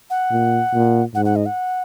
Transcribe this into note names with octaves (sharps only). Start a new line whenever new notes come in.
F#5
A#2
A#2
G#2 F#5
F#5
D#5
F#5